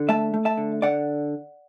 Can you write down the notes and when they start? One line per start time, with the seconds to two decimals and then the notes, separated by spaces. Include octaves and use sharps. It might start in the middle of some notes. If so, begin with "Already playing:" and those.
Already playing: D3
0.09 A3 E5 A5
0.34 A3
0.45 E5 A5
0.57 D3
0.82 D3 D5 F#5